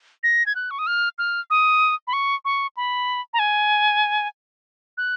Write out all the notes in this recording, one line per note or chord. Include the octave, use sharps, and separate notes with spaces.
A#6
G#6
F#6
C#6
D#6
F6
F6
D#6
B5
C#6
C#6
B5
A#5
G#5
F#6